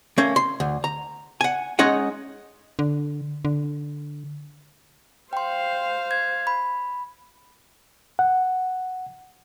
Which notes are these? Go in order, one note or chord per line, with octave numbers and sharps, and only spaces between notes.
A3 A#3 C#4
C6
D2
A#5
F#5 G#5
G#3 C#4 D#4 D#5 F#5
D3
D3
C5 F5 G5 C6
G#6
B5
F#5